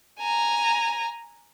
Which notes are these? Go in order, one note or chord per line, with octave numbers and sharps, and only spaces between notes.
G#5 A#5